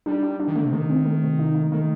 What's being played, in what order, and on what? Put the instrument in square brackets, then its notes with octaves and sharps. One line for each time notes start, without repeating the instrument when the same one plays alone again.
[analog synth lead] G3 [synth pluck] D4
[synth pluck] D4
D4
[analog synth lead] D#3
[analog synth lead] D3 [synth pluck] A3
[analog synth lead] C3
[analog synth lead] D#3 [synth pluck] A3
[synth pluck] C4
A3
C3
D#4
A3
[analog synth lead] D#3 [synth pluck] A3